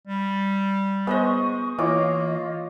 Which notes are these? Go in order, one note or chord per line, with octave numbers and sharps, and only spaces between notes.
G3
G#3 B3 C5 D#5 C#6
E3 A#3 F4 C#5 D#5 D6